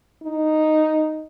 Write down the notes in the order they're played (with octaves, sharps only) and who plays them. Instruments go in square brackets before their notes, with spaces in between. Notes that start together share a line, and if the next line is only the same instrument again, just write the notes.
[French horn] D#4